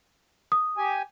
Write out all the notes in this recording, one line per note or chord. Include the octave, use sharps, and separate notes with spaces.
D#6
G4 G#5